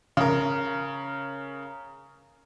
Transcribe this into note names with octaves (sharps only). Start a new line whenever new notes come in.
C#3 A#4